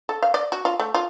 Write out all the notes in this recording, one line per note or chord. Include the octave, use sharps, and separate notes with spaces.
A4
F5
D5
F#4
F4
A3
F4